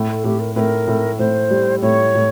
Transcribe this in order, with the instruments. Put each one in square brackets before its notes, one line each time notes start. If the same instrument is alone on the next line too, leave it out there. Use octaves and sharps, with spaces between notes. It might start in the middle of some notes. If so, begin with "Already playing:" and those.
Already playing: [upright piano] A2
[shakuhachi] A4
[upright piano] A2 [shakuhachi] G4
[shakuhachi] A#4
[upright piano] A2 [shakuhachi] A#4 B4
[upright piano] A2
[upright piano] A2 [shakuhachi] C5
[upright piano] G3
[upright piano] A2 [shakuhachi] C#5
[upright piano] A2